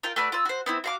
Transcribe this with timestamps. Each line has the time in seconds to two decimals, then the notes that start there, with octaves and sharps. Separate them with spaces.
0.03 F4 A#4 G5
0.16 A3 F#4 B4 D5
0.32 F4 E6
0.45 F#4 C5
0.66 B3 C4 E4
0.84 F#4 F5 D6